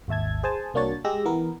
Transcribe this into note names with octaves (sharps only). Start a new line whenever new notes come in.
G#1 D#2 E5 A5 G#6
G#4 C5 G#5 A5
C2 A#3 D4 F#4 C#5 A6
G#3 G4 E6 A#6
E3 B3 A#4